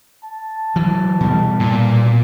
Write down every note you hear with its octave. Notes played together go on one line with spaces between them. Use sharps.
A5
E3 F#3
B2 G3
A#2